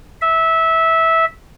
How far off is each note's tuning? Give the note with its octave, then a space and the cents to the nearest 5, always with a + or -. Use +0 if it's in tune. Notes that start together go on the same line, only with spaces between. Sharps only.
E5 -15